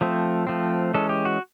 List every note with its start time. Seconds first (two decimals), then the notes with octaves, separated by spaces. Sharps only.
0.01 F3 A3 C4
0.47 F3 A3 C4
0.94 E3 G#3 C#4 A4
1.09 G4
1.25 F#4